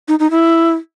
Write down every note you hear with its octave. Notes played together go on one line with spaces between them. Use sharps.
D#4
D#4
E4